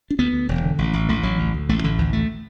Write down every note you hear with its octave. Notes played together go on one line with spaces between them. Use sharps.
D4
D2 B3
D2
E1
D3
A1
A1
A1 A3
A1 F#3
D2
D2
A1 A3
A1 D3
D2 E3
D2 A3